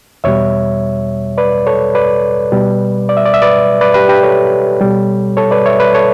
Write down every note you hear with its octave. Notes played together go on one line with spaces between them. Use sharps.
E2 B2 G3 C#5 E5
B4 D5
A4 C#5
B4 D5
B2 G3
D5
E5
D5
E5
B4 D5
B4 D5
G4 B4
G4 B4
A4 C#5
B2 G3
A4 C#5
B4 D5
C#5 E5
B4 D5
A4 C#5